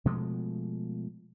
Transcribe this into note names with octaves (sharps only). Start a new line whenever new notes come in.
B2 F3 G#3 A3